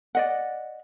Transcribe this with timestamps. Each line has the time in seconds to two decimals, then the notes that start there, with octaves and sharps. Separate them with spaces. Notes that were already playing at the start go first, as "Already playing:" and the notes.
0.15 D5 D#5 F#5